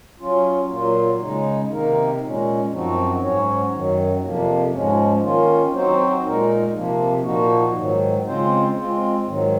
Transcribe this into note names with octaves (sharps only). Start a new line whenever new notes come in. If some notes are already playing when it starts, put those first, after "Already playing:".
F#3 C#4 F4
A#2 F#3 A#3 F4
C#3 G#3 D#4
C3 D#3 A#3 D#4 A#4
A#2 G#3 C#4
F#2 F3 C4 D#4 F#4
G#2 F#3 C#4 F#4 C#5
F#2 D#3 F#3
F2 C3 F3 A#3
G#2 F3 G#3 C#4
D#3 A#3 C#4 F4
F#3 C4 D#4 F#4 C5
A#2 G#3 D#4 A#4
C3 F3 A#3
A#2 F3 A#3 D#4 F#4
G#2 D#3 F#3
C#3 G#3 C4 F4 C5
G#3 C4 F4
G#2 D#3 F#3